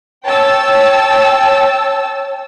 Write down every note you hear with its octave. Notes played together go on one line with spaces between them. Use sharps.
C#5 G5 A5 E6